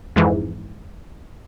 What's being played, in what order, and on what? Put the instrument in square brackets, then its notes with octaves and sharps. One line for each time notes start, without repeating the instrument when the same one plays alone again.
[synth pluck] F2 G#2 E3